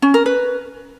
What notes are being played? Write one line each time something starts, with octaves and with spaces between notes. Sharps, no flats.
C#4
A#4
B4